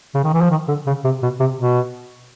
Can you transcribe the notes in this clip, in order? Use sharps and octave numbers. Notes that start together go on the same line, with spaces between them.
C#3
D#3
E3
F3
D#3
D3
C#3
C3
B2
C3
B2